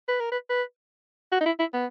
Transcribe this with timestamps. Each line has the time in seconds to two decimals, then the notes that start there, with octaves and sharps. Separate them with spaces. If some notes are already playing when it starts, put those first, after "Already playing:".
0.09 B4
0.20 A#4
0.32 B4
0.50 B4
1.32 F#4
1.41 D#4
1.46 E4
1.60 E4
1.73 B3